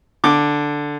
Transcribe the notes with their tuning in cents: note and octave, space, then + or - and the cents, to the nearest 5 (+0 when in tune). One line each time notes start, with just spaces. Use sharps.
D3 +0 D6 +0